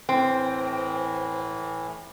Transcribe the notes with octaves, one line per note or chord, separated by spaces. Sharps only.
A2 E3 C4